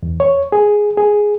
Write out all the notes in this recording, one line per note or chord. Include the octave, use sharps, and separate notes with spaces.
E2
C#5
G#4
G#4